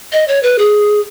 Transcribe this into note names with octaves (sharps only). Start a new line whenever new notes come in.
D#5
C#5
B4
G#4